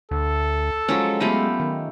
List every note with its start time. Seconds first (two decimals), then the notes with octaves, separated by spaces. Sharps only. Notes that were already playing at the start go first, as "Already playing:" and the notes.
0.11 D2 A4
0.88 F3 F#3 G#3 C#4
1.20 F#3 A3 B3 F4 G4 B5
1.60 D#3